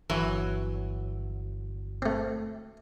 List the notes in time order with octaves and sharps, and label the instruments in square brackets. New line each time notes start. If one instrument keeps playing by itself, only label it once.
[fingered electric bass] G1 [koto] E3 F#3
[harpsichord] A3 C4